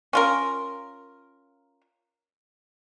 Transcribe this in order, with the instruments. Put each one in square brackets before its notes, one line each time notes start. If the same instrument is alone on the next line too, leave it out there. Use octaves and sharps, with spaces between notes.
[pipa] C#4 F4 A#4